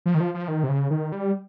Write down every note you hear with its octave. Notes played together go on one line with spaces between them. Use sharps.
F3
D#3
F3
F3
D#3
C3
C#3
D#3
G3